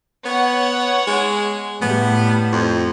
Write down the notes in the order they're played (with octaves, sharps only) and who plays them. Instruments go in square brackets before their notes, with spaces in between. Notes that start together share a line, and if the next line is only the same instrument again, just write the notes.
[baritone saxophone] B3 [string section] C#5 F#5
[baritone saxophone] G#3
[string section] A2 G3 [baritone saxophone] B3
[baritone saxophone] F2